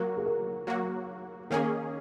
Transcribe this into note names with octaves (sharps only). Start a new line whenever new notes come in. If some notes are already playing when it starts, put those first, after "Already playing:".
Already playing: F#3 A#3 F#4 A#4
G#4
A#4
F#3 A#3 F#4
D#3 A#3 C#4 G#4 A#4